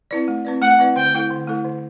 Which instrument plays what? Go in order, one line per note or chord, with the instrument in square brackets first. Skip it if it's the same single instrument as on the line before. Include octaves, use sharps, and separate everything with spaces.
[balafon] C4 E4 B4 D5
A3
C4 E4 B4 D5
[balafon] A3 [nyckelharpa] F#5
[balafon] C4 E4 B4 D5
[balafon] D3 [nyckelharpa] G5
[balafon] A3 E4 A4
D3
A3 E4 A4
D3